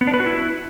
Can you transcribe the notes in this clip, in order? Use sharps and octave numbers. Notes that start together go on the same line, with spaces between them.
B3
D4
B4
F#4
E4